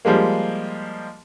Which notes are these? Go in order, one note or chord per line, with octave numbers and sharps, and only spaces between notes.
F3 G3 G#3 A#3